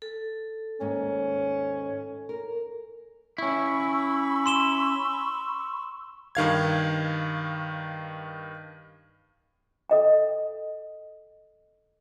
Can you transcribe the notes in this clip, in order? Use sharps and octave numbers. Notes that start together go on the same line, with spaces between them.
A4
D#2 G#2 C#4
A#4
C#4 E4 B5 C#6 E6
C6 E7 G7
G2 D#3 F5 G#6
A4 D#5 G5